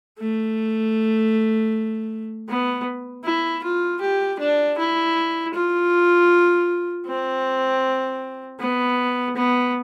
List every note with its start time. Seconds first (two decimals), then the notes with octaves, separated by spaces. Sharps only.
0.19 A3
2.49 B3
3.24 E4
3.63 F4
4.01 G4
4.40 D4
4.78 E4
5.54 F4
7.06 C4
8.60 B3
9.37 B3